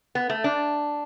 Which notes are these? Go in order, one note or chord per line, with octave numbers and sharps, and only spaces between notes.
B3
A3
D4